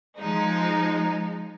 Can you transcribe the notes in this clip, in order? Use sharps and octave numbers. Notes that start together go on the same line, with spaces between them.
F3 G#3 D#4